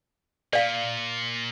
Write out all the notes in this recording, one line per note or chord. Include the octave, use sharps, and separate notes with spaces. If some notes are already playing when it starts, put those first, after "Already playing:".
A#2 D5 F5